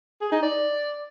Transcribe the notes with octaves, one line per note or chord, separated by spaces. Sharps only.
G#4
D#4
D5